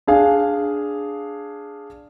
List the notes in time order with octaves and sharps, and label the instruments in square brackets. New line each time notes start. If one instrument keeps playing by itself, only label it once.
[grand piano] D4 G#4 F5 G#5